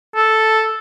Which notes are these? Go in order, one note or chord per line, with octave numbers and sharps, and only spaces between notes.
A4